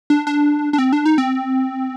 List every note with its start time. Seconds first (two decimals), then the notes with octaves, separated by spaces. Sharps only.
0.10 D4
0.27 D4
0.73 D4
0.78 C4
0.93 D4
1.06 D#4
1.18 C4